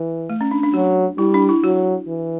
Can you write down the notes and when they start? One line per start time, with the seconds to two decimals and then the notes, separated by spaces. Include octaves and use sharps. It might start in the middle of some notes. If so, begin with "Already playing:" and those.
Already playing: E3
0.30 A3
0.41 C#4
0.51 D4
0.63 D4
0.74 F#3 F#4
1.18 G3 E4
1.34 D4
1.49 E4
1.63 F#3 F#4
2.07 E3